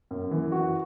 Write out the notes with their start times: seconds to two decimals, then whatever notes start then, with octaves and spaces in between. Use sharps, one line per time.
0.11 F#2
0.31 E3
0.52 F#4